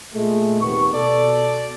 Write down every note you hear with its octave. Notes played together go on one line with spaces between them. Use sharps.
A#2 G#3 A3
D#2 C3 B3 C#6
B2 A4 D5